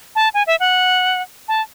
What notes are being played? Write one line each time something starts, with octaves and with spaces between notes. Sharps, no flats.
A5
G#5
E5
F#5
A5